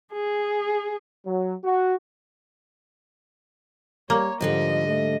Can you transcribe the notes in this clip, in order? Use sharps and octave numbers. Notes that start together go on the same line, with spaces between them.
G#4
F#3
F#4
G3 A#3 C#5
G#2 D3 F3 G3 D#5
A3